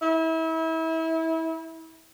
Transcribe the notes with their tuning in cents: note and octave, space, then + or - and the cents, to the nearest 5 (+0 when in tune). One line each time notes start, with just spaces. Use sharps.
E4 -30